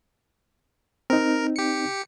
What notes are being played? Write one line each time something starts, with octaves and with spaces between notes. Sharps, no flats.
C4 D#4 A#4
G4 C#7